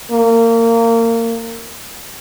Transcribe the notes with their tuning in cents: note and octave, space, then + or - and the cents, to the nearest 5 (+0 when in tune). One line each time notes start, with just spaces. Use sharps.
A#3 -25